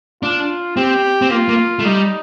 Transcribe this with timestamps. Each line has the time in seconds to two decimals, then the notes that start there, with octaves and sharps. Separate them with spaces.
0.23 D4 F4
0.77 C4 G4
1.22 C4
1.30 A#3 F4
1.49 A#3
1.79 A3
1.84 G3 D#4